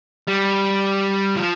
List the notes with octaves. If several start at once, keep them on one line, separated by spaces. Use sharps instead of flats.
G3
F3